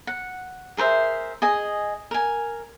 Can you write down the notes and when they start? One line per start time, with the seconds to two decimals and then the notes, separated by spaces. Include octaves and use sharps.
0.07 F#5
0.77 G#4 A#4 C5 E5
1.42 G#4 D#5 G#5
2.11 A#4 G#5